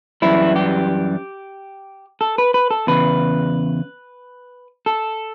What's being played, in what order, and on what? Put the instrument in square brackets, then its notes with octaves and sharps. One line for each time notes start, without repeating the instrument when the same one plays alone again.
[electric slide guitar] F#2 E3 G3 E4
G4
A4
B4
B4
A4
E2 C#3 B4
A4